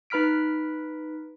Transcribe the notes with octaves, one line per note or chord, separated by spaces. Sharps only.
D#4 B4 B5 F6 B6 D7